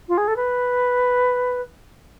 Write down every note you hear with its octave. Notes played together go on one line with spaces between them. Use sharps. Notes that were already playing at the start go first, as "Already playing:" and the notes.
F4
G#4
A4
B4